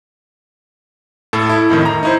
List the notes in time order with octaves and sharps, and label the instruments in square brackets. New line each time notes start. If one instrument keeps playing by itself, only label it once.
[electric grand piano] A2 A4
E4
F2 A2 D#3
A#5
D#4 E4 C5